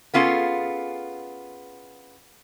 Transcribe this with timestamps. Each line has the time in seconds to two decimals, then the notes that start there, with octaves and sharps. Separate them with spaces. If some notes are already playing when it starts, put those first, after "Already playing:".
0.14 B3 C#4 F4 G#4 A4